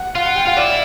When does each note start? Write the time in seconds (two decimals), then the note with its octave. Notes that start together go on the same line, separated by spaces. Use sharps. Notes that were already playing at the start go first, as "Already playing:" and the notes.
Already playing: F#5
0.15 F4 F5
0.26 F#5
0.36 G5
0.46 F4 F5
0.57 E4 D5